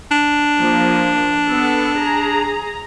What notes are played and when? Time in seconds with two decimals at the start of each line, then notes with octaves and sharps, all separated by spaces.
0.11 D4
0.59 F3 A#3
1.47 B3 A4
1.97 G#4 A#5